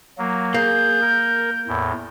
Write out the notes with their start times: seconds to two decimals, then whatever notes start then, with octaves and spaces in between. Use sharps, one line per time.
0.18 F#3 A#3
0.54 A#3 G#4 G6
1.02 A#4
1.67 E2 A2